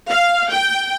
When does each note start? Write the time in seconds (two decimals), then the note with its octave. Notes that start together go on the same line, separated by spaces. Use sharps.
0.11 F5
0.52 G5